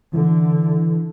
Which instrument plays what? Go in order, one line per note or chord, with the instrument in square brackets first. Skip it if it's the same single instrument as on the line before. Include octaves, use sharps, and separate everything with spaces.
[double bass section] D3 [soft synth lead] E3